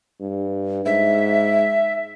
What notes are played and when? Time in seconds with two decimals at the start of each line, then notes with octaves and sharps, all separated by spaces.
0.21 G2
0.86 G#2 E5